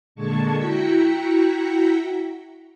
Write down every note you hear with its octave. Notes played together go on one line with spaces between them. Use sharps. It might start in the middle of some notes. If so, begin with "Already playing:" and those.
A#2 D3 G#3 A5 C#6 G#6
E4 F#4 G5 A#5 B6 C#7